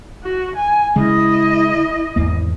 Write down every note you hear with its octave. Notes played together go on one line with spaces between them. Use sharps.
F#4
G#5
C#3 G#3 E4 D#5
G#1 E2 A#3